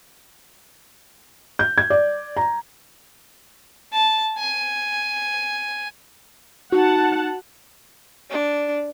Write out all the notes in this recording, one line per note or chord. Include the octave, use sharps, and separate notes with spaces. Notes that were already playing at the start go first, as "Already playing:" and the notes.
G6
G#6
D5
A#5
A5
G#5
D#4 F#4 F#5 A5
D4